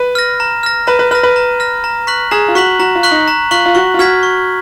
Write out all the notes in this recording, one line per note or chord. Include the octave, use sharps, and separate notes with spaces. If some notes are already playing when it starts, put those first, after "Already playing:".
Already playing: B4
F6 A#6
A#5
F6 A#6
B4 A#5
B4
B4 F6 A#6
B4
A#5
F6 A#6
A#5
C#6 F#6 B6 F#7
G#4 A#5
F4
F#4 C#6 F#6 B6 F#7
F#4 A#5
F4
C#6 F#6 B6 F#7
D#4
A#5
F4 C#6 F#6 B6 F#7
F4
F#4 C#6
F4
F#4 F6 G#6 B6
C#6